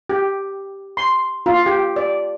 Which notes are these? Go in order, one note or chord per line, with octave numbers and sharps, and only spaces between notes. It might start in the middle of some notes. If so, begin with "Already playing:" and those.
G4
C6
F4
G4
D5